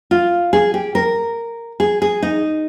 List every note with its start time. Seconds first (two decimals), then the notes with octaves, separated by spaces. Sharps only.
0.11 F4
0.53 G#4
0.74 G4
0.95 A#4
1.80 G#4
2.02 G#4
2.22 D#4